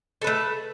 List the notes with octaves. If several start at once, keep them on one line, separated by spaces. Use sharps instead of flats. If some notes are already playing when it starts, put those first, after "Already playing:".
A3 A4 B4